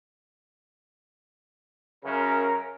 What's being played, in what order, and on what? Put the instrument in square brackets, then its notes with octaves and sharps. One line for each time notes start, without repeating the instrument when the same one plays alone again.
[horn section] F#2 C#3 [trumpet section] A#4